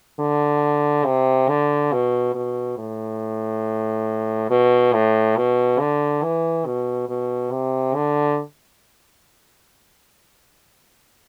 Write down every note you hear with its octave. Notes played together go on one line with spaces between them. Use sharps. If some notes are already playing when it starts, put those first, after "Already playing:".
D3
C3
D3
B2
B2
A2
B2
A2
B2
D3
E3
B2
B2
C3
D3